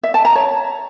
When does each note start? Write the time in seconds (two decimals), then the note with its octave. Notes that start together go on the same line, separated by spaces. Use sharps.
0.03 E5
0.14 A5
0.25 A#5
0.35 C#5